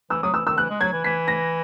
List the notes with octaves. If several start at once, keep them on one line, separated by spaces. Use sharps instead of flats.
E3 E6
F#3 D#6
E3 E6
D#3 E6
E3 F#6
G#3
F#3 G#6
E3
E3 B6
A#6